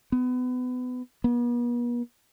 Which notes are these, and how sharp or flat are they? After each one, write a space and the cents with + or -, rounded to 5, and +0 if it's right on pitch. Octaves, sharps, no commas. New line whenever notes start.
B3 +25
B3 -45